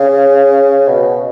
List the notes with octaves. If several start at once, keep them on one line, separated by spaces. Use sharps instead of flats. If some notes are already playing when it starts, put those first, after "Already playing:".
Already playing: C#3
B2